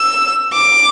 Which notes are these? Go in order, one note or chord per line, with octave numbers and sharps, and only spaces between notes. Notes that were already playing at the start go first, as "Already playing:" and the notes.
Already playing: E6
D6